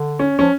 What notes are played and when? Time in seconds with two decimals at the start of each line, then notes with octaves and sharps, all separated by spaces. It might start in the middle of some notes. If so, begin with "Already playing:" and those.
Already playing: D3
0.19 C#4
0.39 F3 C#4